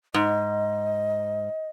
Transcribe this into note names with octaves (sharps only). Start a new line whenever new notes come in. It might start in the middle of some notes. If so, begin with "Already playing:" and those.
G#2 D#5